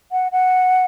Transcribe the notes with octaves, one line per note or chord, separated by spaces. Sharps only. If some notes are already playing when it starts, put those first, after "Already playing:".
F#5
F#5